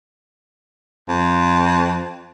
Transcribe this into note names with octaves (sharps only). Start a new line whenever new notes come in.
F2